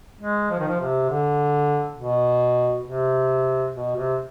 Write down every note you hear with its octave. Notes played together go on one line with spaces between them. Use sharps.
G#3
F3
D#3
F3
C3
D3
B2
C3
B2
C3